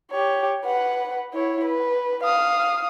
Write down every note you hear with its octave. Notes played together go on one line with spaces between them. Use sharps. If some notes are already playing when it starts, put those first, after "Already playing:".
G4 C#5
B4 F#5
E4 C#5
B4
F5 D#6